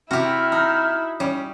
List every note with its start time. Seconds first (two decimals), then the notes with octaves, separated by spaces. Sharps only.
0.11 C3 E4 F#4 G4 F6
0.52 D#4
1.20 G3 C#4